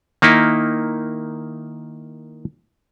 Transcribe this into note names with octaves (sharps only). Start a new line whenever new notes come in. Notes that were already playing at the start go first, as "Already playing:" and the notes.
D#3 A#3 D#4 E4